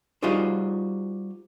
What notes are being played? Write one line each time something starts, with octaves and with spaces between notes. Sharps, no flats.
G3 D#4 F4 F#4 G#4 C5